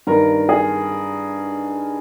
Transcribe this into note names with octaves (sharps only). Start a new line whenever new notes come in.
G2 D#3 A#4
G#4